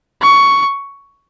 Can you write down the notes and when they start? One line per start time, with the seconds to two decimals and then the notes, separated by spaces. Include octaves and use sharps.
0.22 C#6